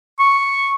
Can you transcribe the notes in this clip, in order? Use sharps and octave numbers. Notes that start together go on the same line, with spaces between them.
C#6